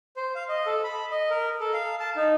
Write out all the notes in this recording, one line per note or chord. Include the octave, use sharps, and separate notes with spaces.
C5
F5
D#5
A4
B5
D#5
A#4
A4
F5
A5
D#4